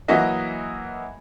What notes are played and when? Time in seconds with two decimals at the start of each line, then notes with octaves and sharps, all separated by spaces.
0.08 E3 F#3 A#3 F#4 D#5 E5